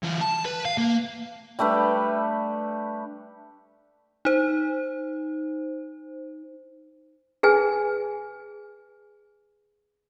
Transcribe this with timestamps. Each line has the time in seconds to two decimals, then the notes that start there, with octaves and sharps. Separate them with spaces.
0.03 E3 F4
0.21 A5
0.45 B4
0.65 F5
0.78 A#3
1.59 G3 A3 D4 B4
4.25 D#4 C5
7.43 G#4 B4 G#5